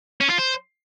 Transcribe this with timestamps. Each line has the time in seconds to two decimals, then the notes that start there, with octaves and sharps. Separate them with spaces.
0.21 C#4
0.30 F4
0.39 C5